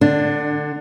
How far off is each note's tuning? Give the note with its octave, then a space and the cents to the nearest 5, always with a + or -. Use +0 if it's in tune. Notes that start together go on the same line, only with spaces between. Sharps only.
D3 +25 D4 +0